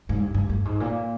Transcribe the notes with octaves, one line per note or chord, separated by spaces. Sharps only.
G#2
G2
G2
G2
G#2
A#2